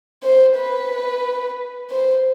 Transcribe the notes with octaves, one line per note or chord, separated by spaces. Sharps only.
C5
B4
C5